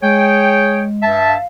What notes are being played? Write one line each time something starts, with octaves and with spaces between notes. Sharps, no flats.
G#3 G#4 C#5 G5
G2 E5 A5
F5